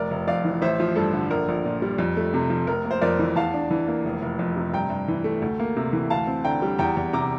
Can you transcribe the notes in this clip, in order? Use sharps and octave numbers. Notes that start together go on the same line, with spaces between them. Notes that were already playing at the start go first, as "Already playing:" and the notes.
Already playing: F1 A#4 D5
F1
F2 D5 F5
E3
A1 C5 E5
F3
G2 A4
D3
A#1 A#4
A#1
A#2
G3
F2
A3
C3
F3
F1 A#4
A#3
C5
F2 A#4 D5
E3
E2 F5 A5
D4
E3
A#3
F1
F1
F2
C3
G2 G5 A#5
G2
E3
A3
D2
A#3
C3
E3
D2 F5 A5
C4
D3 G5 A#5
G3
E2 G5 A#5
E2
C3 A#5 D6